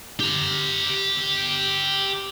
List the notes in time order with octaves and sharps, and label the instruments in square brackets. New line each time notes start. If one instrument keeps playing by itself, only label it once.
[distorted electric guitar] G4 A#5